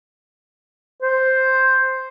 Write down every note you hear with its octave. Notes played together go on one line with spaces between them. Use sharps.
C5